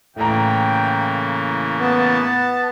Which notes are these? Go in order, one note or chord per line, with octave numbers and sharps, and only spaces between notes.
A2 C#3 E3 A#3 G5 A#5
B3 A5